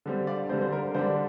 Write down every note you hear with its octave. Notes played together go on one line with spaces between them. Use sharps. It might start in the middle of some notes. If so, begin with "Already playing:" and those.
D3 G3 C4
D5 F5
D3 G3 C4 C5
C5
A#4
D3 G3 D4 C5